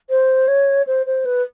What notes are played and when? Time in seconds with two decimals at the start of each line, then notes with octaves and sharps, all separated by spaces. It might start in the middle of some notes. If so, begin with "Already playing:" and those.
0.10 C5
0.48 C#5
0.87 C5
1.06 C5
1.25 B4